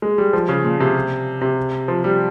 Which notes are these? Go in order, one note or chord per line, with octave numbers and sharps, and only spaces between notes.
G#3
G3
F3
C#3
A#2
C3
C3
F3
G3